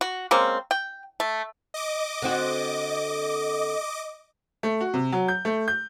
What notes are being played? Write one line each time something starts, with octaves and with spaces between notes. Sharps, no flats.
F#4
G#3 A#3 C4 C#4
G5
A3
D#5 D6
D3 C4 F#4
A3
F#4
C3
F#3
G6
A3
G6